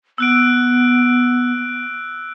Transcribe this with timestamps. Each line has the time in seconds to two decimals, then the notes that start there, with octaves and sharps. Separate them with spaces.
0.18 B3 E6 F#6 D7